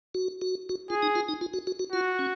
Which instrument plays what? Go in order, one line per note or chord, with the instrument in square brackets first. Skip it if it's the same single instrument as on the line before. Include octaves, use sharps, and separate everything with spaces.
[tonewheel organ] F#4
F#4
F#4
[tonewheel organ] F4 [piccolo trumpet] G#4
[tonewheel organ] D#4
F4
D#4
F4
F#4
F#4
F#4
[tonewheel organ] F4 [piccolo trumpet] F#4
[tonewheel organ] C#4